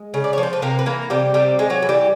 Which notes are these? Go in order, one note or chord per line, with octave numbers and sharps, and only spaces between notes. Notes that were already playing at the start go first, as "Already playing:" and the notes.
Already playing: G#3
C#3
D5
C#5
F3
C5
B4
C3 A#3 A#4
B4
E3 A#3 A#4
C3 G3 G4
C3 G3 G4
G#3
F#3 F#4
E3
G3 G4